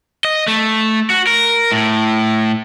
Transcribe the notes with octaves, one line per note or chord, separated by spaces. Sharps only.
D#5
A3
F#4
A#4
A2